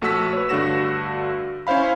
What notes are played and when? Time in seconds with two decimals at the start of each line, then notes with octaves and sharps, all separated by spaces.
0.01 A#1 A3 F#4 E6 B6
0.33 B4 C#5
0.49 G2 D3 A3 F#4 A#6 E7
1.67 C#4 E4 C5 F5 B5